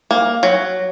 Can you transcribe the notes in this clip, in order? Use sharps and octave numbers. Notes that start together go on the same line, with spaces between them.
A#3
F#3